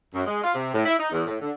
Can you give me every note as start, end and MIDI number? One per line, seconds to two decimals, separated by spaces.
0.13 0.22 42
0.27 0.41 56
0.42 0.51 65
0.54 0.72 48
0.73 0.84 45
0.86 0.94 64
0.98 1.10 63
1.11 1.24 40
1.26 1.36 45
1.41 1.51 50